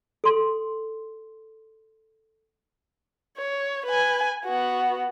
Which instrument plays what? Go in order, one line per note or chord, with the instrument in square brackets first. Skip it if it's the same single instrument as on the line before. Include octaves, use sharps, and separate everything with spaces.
[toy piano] A4 C6
[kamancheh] C#5
B4 G#5
B3 F#4